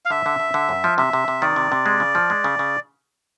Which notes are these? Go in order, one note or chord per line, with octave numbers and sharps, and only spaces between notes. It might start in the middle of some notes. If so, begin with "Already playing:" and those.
F5
D3 E5
D3
D3
D3
F#2
F3
C3 E5
C3
C3
D#3 D5
C3
C3
G#3
C#3
F3
G#3
C#3
C#3